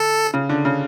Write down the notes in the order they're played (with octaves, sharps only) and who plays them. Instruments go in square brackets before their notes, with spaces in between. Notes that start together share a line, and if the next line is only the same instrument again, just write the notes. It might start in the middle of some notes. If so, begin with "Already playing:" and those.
Already playing: [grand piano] D3 [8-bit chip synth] A4
[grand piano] C#3
D3
C#3